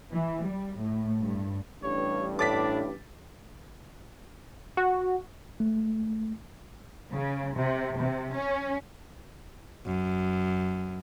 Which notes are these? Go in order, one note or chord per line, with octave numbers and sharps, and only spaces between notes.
E3
G3
A2
G2
A1 G2 C#5
A2 D4 D6 A6 B6
F#4
A3
C#3
C3
C3
C#4
F#2